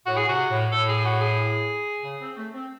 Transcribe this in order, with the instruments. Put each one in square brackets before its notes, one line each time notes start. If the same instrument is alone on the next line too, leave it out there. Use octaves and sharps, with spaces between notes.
[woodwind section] A2 [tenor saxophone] F#4
[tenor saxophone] G#4
[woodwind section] C3 [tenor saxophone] F#4
[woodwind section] A2
[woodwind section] A2 [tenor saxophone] A4
[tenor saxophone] G#4
F#4
G#4
[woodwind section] C#3
C4
A3
C4